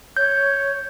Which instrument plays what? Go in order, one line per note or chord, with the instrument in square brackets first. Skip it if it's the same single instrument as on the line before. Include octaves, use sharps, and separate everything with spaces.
[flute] C#5 [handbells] G6